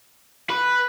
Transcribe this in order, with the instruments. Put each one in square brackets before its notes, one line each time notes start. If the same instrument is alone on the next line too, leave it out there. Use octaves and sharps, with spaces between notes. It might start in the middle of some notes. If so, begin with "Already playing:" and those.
[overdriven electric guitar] B4